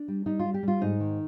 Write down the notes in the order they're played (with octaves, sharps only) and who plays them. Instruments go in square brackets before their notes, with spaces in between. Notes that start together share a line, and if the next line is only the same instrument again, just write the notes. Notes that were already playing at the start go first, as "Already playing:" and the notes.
Already playing: [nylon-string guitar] D4
G3
G3 D#4
G3 F4
G4
G3 F4
G#2 D#4
D#3